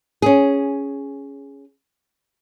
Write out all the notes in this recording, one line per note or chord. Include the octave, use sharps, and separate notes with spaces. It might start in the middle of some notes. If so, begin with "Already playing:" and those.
C#4 G#4